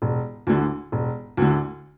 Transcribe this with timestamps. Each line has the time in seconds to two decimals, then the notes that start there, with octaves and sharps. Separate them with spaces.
0.02 E1
0.47 D2 D3
0.92 E1
1.37 D2 D3